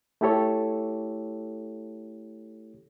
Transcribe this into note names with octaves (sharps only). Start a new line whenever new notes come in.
A3 E4 G4 A4 C#5